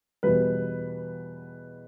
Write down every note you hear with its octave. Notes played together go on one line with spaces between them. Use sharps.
E2 B2 G3 B3 B4